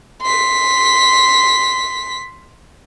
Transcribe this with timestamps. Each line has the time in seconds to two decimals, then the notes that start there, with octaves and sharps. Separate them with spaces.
0.22 C6 B6